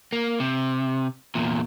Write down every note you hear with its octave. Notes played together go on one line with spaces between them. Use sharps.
A#3
C3
E2 A#2